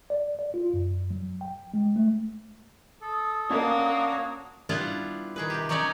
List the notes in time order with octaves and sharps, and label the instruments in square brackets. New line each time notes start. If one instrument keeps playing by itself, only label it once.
[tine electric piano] D5
D5
F4
F#2
F#3
G5
G#3
A3
[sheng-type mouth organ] A4 [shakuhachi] D#6
[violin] A#3 [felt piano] C#4 D#5 A5 [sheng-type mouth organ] D4 F#4 C#5
[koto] G3 B3 D4 E4 F4
D#3 G#4 B4
C3 G4
F#3 G3 C#4 D#4 C#5 D5